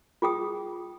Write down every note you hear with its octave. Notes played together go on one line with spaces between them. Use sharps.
F4 G#4 G5 D#6